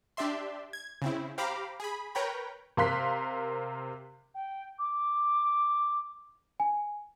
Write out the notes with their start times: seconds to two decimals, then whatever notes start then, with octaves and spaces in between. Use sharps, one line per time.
0.17 D4 G4 D5 E5 C6
0.73 G#6
1.02 C#3 C4 E4
1.38 G4 C5 F5 A#5 B5 D6
1.80 G#4 B5
2.15 A#4 B4 C#5 G5 A#5 B5
2.77 C3 A#4 F5 C6 F#6 B6
4.34 G5
4.78 D6
6.60 G#5